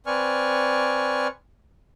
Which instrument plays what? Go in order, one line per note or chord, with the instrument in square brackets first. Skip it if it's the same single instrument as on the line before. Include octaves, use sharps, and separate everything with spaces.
[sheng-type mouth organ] C4 B4 D5 G#5 C#6 F6